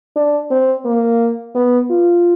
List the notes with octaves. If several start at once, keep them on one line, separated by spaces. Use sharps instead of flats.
D4
C4
A#3
B3
F4